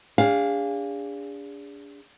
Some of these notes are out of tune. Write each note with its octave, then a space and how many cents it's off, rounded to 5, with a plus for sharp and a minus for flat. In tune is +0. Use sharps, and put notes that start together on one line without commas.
D4 -30 G#4 -30 F5 +0